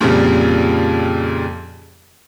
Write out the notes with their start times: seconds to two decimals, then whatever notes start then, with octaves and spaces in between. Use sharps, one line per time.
0.01 F2 A#2 C#3 F3 G3